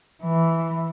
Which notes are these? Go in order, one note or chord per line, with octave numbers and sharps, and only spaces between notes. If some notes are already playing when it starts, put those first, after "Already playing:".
E3